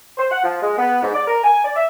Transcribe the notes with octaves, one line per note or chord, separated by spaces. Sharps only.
C5
F#5
F3
G#3
B3
G#2
D5
A#4
G#5
D5
E5